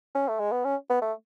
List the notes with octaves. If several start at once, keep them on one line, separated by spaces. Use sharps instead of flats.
C#4
A3
G#3
B3
C#4
B3
A3